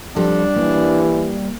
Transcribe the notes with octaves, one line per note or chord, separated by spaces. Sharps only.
F3 G3 C4 D4 A4
E3 A#3